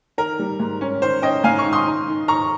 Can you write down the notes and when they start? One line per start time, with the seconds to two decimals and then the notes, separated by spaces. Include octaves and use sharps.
0.18 D#3 A#4
0.39 G3
0.60 G#2
0.81 C#4
1.02 D#3 C5
1.22 C#4 D#5 G5
1.44 G#2 F5 G#5
1.58 C#6 F6
1.65 D#3
1.73 C6 D#6
1.87 D#4
2.07 D#3
2.28 D#3 A#5 C#6